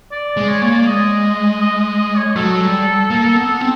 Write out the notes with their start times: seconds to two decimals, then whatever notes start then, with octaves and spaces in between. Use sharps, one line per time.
0.12 D5
0.37 G#3
0.49 C#5
0.62 A#3 C#5
0.74 D5
0.86 G#3 D#5
1.61 D#5
1.80 D#5
1.99 D#5
2.17 C#5
2.36 F#3 A4
2.61 G3
3.10 A#3
3.36 B3
3.60 C4